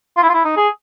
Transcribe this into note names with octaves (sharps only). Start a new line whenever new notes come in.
F4
E4
F4
E4
D#4
G#4